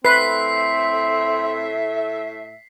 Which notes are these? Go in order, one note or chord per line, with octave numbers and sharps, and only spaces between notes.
A2 A3 C4 B4 E5 B6 C7